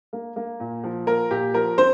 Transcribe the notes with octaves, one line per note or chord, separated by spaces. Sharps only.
A#3
A#3
A#2
F3
A#3 A#4
A#2 G4
F3 A#4
C4 C5